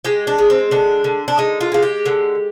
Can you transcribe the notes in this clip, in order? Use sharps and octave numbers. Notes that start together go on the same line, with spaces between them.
G#3 G4
D4
G#3
C4
D3 D4
D3
D4
G#3 D#4
F4
G#3 F4
G4
D3